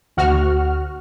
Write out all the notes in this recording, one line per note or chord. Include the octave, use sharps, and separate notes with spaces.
D2 F#4 F6